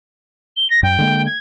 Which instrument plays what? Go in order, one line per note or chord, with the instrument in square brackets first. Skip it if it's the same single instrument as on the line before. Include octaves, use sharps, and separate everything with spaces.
[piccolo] G7
A#6
[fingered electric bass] F#2 [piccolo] G5
[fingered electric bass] D3 G#3 A#3
[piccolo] G#6